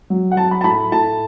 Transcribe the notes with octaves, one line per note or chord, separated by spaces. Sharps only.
F#3
F#5
F#3 A5
B5
A5
A2 B5
A2 A5